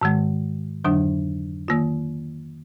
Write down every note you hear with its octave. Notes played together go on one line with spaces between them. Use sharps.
G#2 D#3 G#3
F2 D3 F#3 D4
D#3 A#3 F4